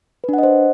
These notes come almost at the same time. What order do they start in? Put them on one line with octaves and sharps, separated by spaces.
B4 D4 F#5 D#5 C5